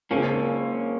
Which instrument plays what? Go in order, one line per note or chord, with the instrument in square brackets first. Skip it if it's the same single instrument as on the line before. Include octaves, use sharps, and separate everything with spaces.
[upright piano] C#3 G#3 C4 F4 [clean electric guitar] A#3 C#4